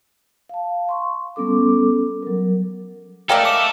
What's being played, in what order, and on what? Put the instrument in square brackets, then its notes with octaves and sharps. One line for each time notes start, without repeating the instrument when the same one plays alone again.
[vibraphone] F5 A5
C6 C#6
G3 B3 C#4 A4 D6
F#3 A#4
[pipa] G#3 A#4 D5 [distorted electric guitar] A4 E5 [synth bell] F5 G5
[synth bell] D6 C#7